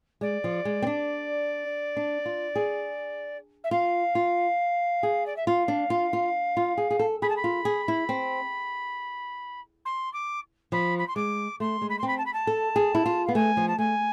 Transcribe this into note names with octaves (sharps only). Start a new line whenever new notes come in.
G#3 D5
F3
G#3
C4
D4
D4
F4
G#4
E5
F4 F5
F4
G#4
D5
E5
F4 F5
D4
F4
F4
F4
G#4
G#4
A4
G#4 B5
A5
B5
F4
G#4
E4
C4
C6
D6
F3 B5
B5
C6
G#3 D6
A3 C6
G#3
B5
C6
C4 B5
A5
B5
A5
A4
G#4
E4
F4
B3 F5
A3 G#5
F3
A5
A3 G#5